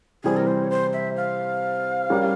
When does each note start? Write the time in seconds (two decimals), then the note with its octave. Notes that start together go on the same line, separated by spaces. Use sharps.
0.24 C3 E3 G3 C4 G#4
0.37 A#4
0.47 C5
0.64 C#5
0.70 C5
0.93 E5
1.17 F5
2.10 G3 C#4 G4 A#4